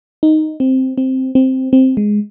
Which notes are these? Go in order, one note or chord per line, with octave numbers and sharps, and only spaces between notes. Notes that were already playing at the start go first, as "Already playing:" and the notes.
D#4
C4
C4
C4
C4
G#3